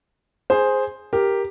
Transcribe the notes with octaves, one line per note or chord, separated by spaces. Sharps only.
G#4 C5
G4 A#4